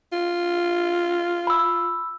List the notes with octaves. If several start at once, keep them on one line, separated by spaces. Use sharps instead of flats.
F4
B5 E6